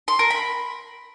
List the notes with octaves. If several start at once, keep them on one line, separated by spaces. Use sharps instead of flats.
C6
A#4
B5